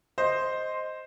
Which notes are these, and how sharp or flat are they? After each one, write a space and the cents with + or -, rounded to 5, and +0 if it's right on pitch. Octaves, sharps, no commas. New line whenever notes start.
C5 +0 D#5 +0